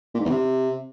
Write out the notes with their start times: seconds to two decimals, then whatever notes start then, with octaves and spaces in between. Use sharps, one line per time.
0.15 A#2
0.20 G#2
0.25 E2
0.30 C3